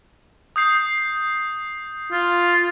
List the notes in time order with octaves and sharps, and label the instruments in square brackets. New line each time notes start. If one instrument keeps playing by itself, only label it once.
[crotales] D#6 G6 C7
[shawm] F4